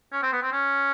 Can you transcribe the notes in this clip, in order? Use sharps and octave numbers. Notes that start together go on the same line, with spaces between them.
C#4
C4
B3
C4
C#4